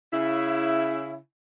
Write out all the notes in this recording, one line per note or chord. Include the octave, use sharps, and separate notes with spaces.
C#3 E4